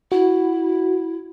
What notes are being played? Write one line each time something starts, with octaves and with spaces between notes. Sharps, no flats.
E4 F#4